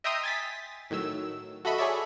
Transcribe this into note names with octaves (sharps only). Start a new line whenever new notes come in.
D#5 E5 G5 A#5 C6 D#6
G#5 A6 B6
A2 D#3 F#3 E6
F#4 A4 D#5 E5 B5 C#6
G#4 A4 C#5 D5 E5